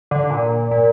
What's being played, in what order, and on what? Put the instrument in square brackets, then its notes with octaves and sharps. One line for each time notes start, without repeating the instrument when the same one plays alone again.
[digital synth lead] D3
A#2
A#2